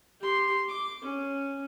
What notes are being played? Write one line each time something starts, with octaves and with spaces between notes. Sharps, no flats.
G4 C6
D6
C#4